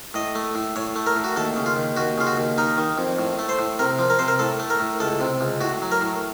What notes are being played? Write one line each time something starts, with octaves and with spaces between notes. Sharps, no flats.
A2 D#5
A3
A2
A2 C#5
A3
A#4
A2
F#4
D#2 A4
C#3
F4
D#2
D#2 F#4
C#3 F4
F#4
D#2
D#4 A#4
D#3
F2
A2
A3
C5
A2
C3 A#4
F3
A#4
C3 C5
A#4
A2 A4
A3
A#4
A2
C#2 A4
C3
C#2
A2 F#4
F#3
A#4
A2